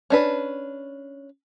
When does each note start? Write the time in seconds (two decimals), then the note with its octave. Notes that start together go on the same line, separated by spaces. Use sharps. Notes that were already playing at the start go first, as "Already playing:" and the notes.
0.10 C#4 D4 B4